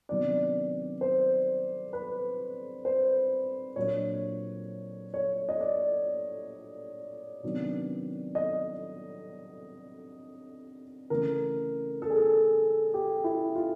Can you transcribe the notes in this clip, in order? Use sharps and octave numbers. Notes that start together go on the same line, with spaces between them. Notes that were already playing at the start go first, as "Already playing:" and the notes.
C3 D#3 F#3 B3 D4 D5
C5
B4
C5
A#2 F#3 A#3 D4 C#5
C#5
D#5
D5
C3 D#3 F#3 B3 D4
D#5
C#3 E3 A3 A#4
A4
G#4
A4
G4
E4
F4